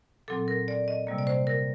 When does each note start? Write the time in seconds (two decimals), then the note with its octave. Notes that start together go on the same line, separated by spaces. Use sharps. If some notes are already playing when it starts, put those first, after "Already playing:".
0.28 A#2 F#3 C4 A4
0.48 A#4
0.68 D5
0.88 D#5
1.07 C3 G3 A#3
1.19 D5
1.27 C5
1.47 A#4